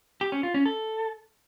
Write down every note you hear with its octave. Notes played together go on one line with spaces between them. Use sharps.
G4
C#4
F4
C#4
A4